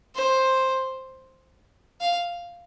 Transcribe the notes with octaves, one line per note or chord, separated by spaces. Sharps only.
C5
F5